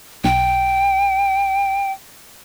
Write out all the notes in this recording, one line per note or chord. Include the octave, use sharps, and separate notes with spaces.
B1 G5